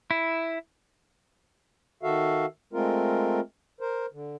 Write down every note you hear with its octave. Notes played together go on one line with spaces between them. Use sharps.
E4
D#3 F#4 A4 E5 F5
G#3 A3 C4 F4 A#4
A#4 C5
D3